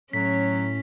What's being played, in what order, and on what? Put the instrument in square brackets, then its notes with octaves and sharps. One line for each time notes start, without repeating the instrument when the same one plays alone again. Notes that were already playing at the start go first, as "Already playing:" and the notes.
[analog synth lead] A2 [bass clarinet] F#3 [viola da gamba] C#4 [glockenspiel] B6